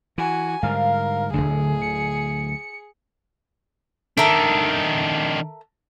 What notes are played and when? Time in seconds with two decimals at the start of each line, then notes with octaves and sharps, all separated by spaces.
0.18 E3 F#4 G#5
0.63 G#2 D3 G3 A#4 F5
1.33 D1 G1 D2 D3 G#4
1.82 C#7
4.17 D#3 D4 A4 A#4 E5